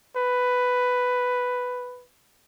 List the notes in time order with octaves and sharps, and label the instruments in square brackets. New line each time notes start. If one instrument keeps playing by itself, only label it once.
[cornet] B4